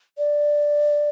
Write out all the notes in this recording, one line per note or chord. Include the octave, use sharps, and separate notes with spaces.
D5